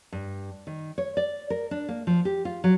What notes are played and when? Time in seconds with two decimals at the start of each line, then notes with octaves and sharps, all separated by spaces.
0.12 G2
0.67 D#3
0.98 C#5
1.17 D5
1.50 A#4
1.71 D4
1.89 A#3
2.07 F3
2.25 G4
2.45 F4
2.64 F#3